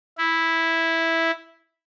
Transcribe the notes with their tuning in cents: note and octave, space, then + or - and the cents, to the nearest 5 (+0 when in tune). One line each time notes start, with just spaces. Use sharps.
E4 -5